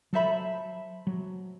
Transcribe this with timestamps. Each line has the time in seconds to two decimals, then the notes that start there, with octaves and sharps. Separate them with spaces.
0.13 F#3 A4 C5 E5 B5
1.07 F#3